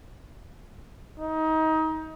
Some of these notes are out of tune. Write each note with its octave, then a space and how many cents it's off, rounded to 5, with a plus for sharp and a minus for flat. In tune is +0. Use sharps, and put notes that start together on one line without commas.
D#4 +25